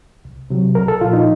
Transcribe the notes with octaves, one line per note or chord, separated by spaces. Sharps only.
C2
C3 F#3
C2 A#4
A4
A#2 F3 F4
D#4